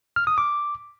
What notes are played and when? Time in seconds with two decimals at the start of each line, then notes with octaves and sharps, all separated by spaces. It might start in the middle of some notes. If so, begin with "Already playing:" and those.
0.16 F6
0.27 D#6
0.38 D6